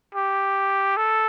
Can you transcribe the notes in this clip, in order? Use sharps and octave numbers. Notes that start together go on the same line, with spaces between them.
G4
A4